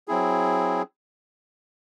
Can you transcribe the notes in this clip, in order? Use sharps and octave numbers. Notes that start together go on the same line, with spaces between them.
F#3 C4 E4 G#4